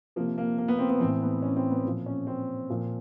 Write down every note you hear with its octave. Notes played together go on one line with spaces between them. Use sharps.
C3 F3 A#3
A#3
A#3
B3
C4
B3
A2 E3 C4
B3
C#4
C4
B3
A#2 F3
C#4
C4
A#2 F3